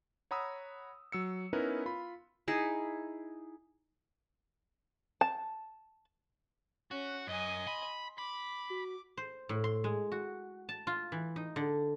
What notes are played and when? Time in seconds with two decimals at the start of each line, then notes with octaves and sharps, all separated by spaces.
0.31 C#5 F#5 A#5 B5 D#6 E6
1.12 F#3 E6 C#7
1.53 B3 C#4 D#4 E4 A#4 B4
1.86 F4 B5
2.48 D#4 E4 G#4
5.21 A5
6.91 C#4 F#4 F#6
7.27 F#2 D#5 G#5
7.67 B5 C6
8.18 B5 D6
8.70 F#4
9.17 C5
9.49 A2
9.64 C6
9.84 G#3
10.12 F#4
10.69 A5
10.87 F4
11.12 E3
11.36 D#4
11.56 D3